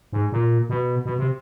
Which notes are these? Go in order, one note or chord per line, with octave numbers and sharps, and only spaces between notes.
G#2
A#2
B2
B2
C3